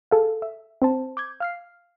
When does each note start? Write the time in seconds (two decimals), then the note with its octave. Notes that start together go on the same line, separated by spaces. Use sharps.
0.11 G#4 A4 F5
0.42 E5
0.82 C4 C5 A5
1.17 D6 G6 G#6
1.40 F5 F6 C7